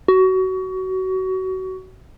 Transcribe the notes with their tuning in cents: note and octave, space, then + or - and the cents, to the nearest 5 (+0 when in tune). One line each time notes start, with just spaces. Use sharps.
F#4 +25